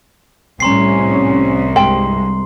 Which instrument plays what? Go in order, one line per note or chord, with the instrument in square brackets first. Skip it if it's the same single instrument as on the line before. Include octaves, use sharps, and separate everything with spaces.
[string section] C2 [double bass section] A2 C#4 [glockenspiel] A#5 C6 C7
[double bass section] G2 G#3 [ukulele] G5 [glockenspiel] C6